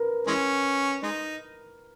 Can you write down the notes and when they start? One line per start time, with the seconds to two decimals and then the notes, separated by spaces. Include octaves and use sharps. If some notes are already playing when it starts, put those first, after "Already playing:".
Already playing: A#4 B4
0.27 E3 G#3 C#4
1.03 G#3 D#4